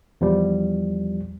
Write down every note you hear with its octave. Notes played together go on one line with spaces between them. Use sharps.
E2 F3 G3